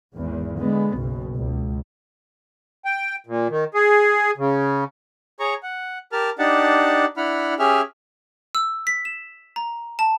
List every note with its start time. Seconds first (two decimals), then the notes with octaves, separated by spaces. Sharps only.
0.13 G#1 E2
0.58 D3 G#3 B3
0.96 F#1 B1 B2
1.35 C#2
2.85 G5
3.26 A#2
3.50 D#3
3.74 G#4
4.37 C#3
5.40 G#4 C#5 A#5 C#6
5.63 F#5
6.12 G4 A#4 A5 F6
6.39 D4 D#4 G4 F#5 A5
7.17 D4 E4 F#5 B5 F6
7.59 C#4 G4 G#4 E5 F6
8.55 E6
8.87 B6
9.05 E7
9.56 A#5
9.99 A5